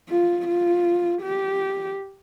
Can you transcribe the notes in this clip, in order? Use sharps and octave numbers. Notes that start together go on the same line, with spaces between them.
F4
F4
G4